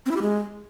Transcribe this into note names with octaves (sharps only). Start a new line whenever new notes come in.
C4
E4
G4
G#3